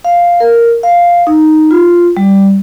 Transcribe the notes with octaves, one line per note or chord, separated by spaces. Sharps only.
F5
A#4
F5
D#4
F4
G3